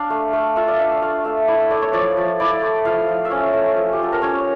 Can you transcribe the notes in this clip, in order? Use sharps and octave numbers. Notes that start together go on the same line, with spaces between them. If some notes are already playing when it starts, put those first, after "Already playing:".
Already playing: D4 F5
A3
A3
F4 E5
D5
D4 E5
F5
A3 F5
A3 E5
E4 D5
E5
A3 D5
C#5
F3 D5
F3
E4 D5
A3
F3 F5
F3
E5
C#4 D5
A3
F3
G4
F4 A4
A#4
C#4 C#5